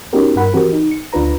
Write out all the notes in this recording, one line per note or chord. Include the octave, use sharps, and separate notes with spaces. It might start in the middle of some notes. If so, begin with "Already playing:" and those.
B3 C#4 D#4 F#4 G4 A#4
G2 A#4 F#5 B5
E3 C4 F#4 G4 A#4
D#4
C#7
D2 D4 F4 B4 A#5